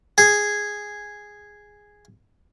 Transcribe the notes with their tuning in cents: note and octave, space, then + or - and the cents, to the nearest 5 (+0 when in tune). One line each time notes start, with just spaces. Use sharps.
G#4 -5